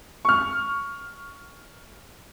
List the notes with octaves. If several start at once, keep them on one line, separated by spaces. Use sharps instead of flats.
C#6 F6